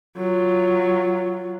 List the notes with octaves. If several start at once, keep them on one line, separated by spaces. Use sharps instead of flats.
F#3 F4